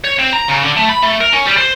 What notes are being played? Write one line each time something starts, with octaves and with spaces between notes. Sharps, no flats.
C#5
C4
A#5
C#3
D3
A3
B5
A3
A#4
C#4
G3
C5